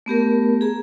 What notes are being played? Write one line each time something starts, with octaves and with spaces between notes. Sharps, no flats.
A3 B3 G4 A#4
G#4 A#5